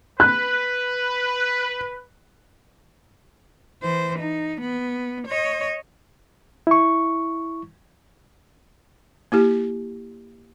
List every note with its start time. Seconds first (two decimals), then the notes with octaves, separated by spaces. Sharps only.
0.20 B4 F#6
3.82 E3 C5
4.19 D#4
4.61 B3
5.28 C#5 D#5
6.67 E4 C#6
9.32 A#3 E4 G4